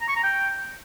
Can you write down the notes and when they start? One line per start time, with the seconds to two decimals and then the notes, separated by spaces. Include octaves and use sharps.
0.01 A#5
0.08 C#6
0.16 A#5
0.23 G5